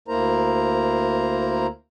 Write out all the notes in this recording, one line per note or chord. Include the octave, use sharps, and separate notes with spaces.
D2 A#3 E4 A#4 C5 A#5